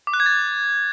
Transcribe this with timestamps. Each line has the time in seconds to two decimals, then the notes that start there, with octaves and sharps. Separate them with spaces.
0.07 D6
0.14 F#6
0.20 G#6
0.26 A6